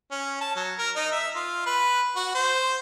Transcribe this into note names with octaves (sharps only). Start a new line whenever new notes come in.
C#4
A5
F#3
A#4
D#4
E5
F4
B4
F#4
C5